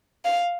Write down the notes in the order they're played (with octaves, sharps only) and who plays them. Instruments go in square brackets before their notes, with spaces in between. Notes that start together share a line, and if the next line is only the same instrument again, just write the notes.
[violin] F5